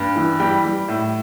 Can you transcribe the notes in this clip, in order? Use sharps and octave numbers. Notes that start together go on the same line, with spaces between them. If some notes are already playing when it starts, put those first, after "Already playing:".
Already playing: G2
E3
G3 G5
G3
A2